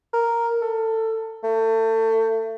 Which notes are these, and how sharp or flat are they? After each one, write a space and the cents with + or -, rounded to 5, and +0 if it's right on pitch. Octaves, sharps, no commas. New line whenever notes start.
A#4 +0
A4 +20
A3 +30